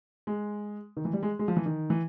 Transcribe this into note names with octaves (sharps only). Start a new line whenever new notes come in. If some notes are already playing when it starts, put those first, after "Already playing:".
G#3
D#3
E3
G3
G#3
G#3
F3
E3
D#3
E3